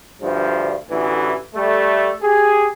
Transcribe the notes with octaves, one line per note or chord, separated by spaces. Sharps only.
D2 G2 F3
A1 D2 E3
G3 A3
G4 G#4